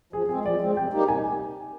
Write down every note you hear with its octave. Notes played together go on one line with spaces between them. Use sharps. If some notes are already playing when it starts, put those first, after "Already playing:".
F3 G#4
G#3 C4 G#4
F3 D5
G#3 C4
C3 G5
G3 A#3 D#4 G4
C3 G#5